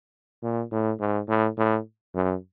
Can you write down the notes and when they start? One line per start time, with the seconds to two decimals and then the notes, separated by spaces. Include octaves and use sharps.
0.43 A#2
0.72 A2
1.00 G#2
1.28 A2
1.58 A2
2.15 F#2